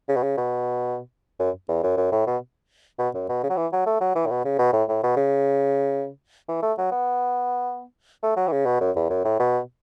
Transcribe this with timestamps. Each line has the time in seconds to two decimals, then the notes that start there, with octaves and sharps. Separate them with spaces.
0.09 C#3
0.16 B2
0.23 C#3
0.38 B2
1.40 F#2
1.69 E2
1.84 F#2
1.98 F#2
2.12 A2
2.27 B2
2.99 B2
3.15 F#2
3.29 B2
3.44 C#3
3.50 F#3
3.57 E3
3.73 F#3
3.87 A3
4.01 F#3
4.16 E3
4.26 A2
4.31 B2
4.45 C#3
4.59 B2
4.73 A2
4.89 A2
5.03 B2
5.17 C#3
6.49 E3
6.63 A3
6.78 F#3
6.92 B3
8.23 A3
8.37 F#3
8.48 E3
8.53 C#3
8.66 B2
8.81 F#2
8.96 E2
9.10 F#2
9.25 A2
9.40 B2